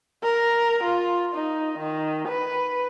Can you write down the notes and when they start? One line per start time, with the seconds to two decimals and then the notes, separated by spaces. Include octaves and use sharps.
0.23 A#4
0.83 F4
1.35 D#4
1.78 D#3
2.28 B4